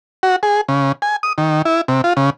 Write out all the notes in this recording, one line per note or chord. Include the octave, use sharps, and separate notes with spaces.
F#4
G#4
C#3
G#5
D#6
D#3
E4
C3
F4
C#3